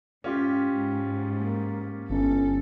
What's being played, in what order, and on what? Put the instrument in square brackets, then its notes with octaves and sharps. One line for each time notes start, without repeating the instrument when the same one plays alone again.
[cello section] G#2 [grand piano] C#4 F4 G4
[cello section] G#2
[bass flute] A#3
[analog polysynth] G1 [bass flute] C#4 [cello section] A4